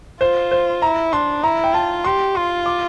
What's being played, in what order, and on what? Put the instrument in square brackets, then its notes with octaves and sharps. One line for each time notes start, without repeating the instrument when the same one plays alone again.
[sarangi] F4 [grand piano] C5
[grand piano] C5
[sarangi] E4 [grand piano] A#5
[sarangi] D4 [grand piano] C6
[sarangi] E4 [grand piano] A#5
[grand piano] G5
[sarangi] F4 [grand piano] A5
[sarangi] G4 [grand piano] C6
[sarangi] F4 [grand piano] C6
[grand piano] D6